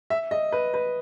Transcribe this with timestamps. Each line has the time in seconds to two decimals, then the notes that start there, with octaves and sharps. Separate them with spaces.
0.10 E5
0.31 D#5
0.52 B4
0.74 B4